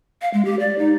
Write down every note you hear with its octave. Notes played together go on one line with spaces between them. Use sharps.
F5
G#3
G4
D5
D#4